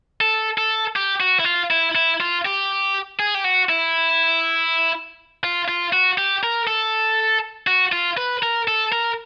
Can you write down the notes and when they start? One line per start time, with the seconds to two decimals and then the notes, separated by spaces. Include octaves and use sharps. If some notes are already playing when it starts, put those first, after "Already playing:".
0.21 A4
0.58 A4
0.96 G4
1.20 F#4
1.40 E4
1.45 F4
1.71 E4
1.95 E4
2.20 F4
2.45 G4
3.19 G#4
3.34 G4
3.44 F#4
3.69 E4
5.44 F4
5.68 F4
5.93 F#4
6.18 G4
6.43 A#4
6.67 A4
7.67 F#4
7.92 F4
8.17 B4
8.43 A#4
8.68 A4
8.92 A#4